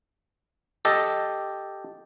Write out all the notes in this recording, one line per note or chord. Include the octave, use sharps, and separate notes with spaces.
G4 A4 D#5